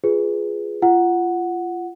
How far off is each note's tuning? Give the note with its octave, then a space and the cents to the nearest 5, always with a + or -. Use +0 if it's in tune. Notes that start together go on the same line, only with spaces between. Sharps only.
F4 +0 G#4 +0 B4 +0
F4 -25 F#5 +0